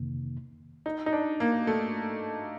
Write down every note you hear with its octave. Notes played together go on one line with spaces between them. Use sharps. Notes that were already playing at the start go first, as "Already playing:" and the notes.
Already playing: F2 C3 D#3 A#3
D#4
D#4
D4
A#3
A3